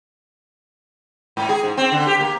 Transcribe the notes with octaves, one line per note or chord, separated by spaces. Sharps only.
G#2
G#4
G#2
C4
D3
G4
A#3